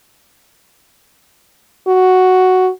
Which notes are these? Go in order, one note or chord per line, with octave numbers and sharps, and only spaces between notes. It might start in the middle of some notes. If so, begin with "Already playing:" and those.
F#4